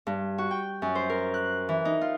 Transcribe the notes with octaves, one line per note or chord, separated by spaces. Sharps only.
G2
F#4
G5
F#2
C5
A#4
F#6
E3
D#4
F4